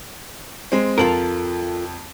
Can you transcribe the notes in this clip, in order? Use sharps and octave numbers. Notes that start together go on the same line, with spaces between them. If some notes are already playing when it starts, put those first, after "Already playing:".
G#3 C4
F2 F4 A4 A#4 A5 F#7